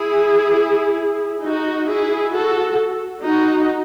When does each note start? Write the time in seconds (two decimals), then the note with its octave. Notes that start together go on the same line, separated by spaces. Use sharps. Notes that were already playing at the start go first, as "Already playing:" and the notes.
Already playing: E4 G#4
1.43 D#4 F#4
1.88 E4 G#4
2.33 F#4 A4
3.24 D#4 F#4